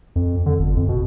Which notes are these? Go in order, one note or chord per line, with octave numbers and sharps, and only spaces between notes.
F2
D3
G1
F2
B2